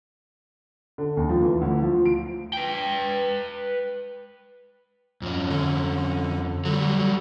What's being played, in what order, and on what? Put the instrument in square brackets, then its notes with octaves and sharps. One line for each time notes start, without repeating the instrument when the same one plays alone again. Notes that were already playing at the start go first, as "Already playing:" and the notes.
[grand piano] D3
D#2
F3
E3
D2
F3
D7
[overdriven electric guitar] B4 G5
[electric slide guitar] F2 C#4
[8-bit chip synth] D3
[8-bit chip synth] D3 [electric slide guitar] F#3 G3